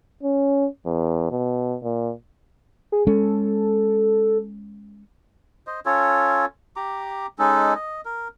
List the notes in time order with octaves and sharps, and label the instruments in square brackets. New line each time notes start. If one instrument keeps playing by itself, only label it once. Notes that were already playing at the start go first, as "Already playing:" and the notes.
[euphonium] C#4
E2
B2
A#2
[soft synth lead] G#4
[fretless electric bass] G#3 C#4 [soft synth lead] A4
[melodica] C5 D#5
C#4 F4 A4 C#5
G4 A#5 D6
G#3 C#4 D#4 A4
D#5
A#4